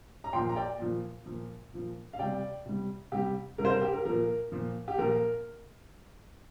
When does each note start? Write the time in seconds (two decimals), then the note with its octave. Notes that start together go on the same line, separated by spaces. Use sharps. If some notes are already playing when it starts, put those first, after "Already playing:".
0.24 A#5
0.33 A#2 G5 C6
0.36 F3
0.49 A#5
0.56 D5 G5
0.79 A#2 F3
1.26 A#2 F3
1.73 A#2 F3
2.13 F5
2.19 C3 G3 D5 G5
2.66 C3 G3
3.12 C3 G3 G4
3.58 C3 G3 A#4
3.65 C5
3.70 A#4
3.82 G4
3.93 A#4
4.05 A#2 F3 A#4
4.52 A#2 F3
4.88 G4
4.98 A#2 F3 A#4